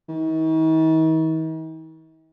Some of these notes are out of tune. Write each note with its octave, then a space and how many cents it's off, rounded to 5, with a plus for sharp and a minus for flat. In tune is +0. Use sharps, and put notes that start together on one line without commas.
D#3 +45